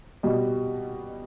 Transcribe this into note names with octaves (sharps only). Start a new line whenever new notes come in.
B2 G3 D#5